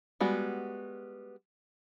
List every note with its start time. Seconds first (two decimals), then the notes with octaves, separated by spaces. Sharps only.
0.20 G3 G#3 B3 F#4